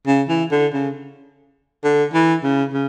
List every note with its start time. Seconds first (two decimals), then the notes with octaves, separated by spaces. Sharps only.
0.07 C#3
0.29 E3
0.51 D3
0.73 C#3
1.84 D3
2.14 E3
2.43 C#3
2.73 C#3